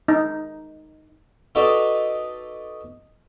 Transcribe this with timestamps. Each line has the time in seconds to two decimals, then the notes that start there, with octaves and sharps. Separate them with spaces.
0.08 D#4
1.55 D#4 F#4 A4 B4 D5 D#5